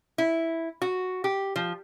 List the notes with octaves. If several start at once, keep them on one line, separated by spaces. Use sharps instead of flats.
E4
F#4
G4
F3